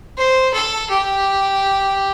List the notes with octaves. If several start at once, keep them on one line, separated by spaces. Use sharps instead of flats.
C5
A4
G4